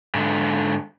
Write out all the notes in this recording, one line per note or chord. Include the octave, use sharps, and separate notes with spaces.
G#2 D3